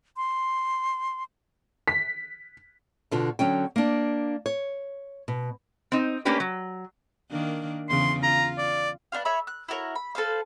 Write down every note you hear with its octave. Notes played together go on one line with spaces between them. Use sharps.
C6
B6
B2 D3 F4
D3 F#3 C#4 G5
A#3 D4
C#5
B2
C4 D#4
A3 A#3 C#4 D4 G4 B4
F#3
D#3 A#3 D4
E2 C#3 E3 C6
F4 A#5
D5
B3 D4 F4 F5
C#5 E5 B5
F#6
E4 F#4 A#4 C#5
B5
A4 B4 C5 F5